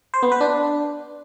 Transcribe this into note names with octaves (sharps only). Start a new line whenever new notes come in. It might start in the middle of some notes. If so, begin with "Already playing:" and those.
C5
B3
B4
D4